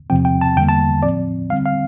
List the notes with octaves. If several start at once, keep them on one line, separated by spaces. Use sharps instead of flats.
E2 C3 F3 C4 G5
G5
A5
E2 D3 G3 A#3 G5
A5
A2 F3 C4 D5
D3 G3 C4 F5
F5